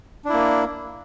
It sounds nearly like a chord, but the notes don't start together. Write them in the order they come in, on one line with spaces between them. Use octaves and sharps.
D4 E4 A#3